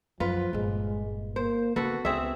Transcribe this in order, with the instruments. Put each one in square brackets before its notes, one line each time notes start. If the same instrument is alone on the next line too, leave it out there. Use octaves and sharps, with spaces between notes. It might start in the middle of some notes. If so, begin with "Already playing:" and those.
[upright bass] F#2 [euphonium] F3 [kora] F4 B4
[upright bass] G1 A#2 [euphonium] G#3
[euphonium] A#3 [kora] C5
[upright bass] C#3 A#3 [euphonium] B3 [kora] F#4 A4 B4
[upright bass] C#2 [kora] C4 G#4 E5